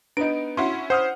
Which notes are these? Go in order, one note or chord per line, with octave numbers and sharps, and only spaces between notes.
B3 D4 D#4 D7
C#4 E4 F#4 C6
C5 F#5 D#6 F6